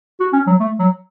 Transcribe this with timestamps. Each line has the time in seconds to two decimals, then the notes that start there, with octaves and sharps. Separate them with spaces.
0.20 F#4
0.33 C#4
0.47 F#3
0.60 A3
0.79 F#3